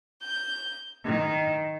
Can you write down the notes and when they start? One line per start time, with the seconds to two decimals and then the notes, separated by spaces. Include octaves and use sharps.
0.22 G6
1.04 D#3